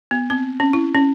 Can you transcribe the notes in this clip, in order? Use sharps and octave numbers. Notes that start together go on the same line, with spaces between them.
B3
C4
C#4
E4
C#4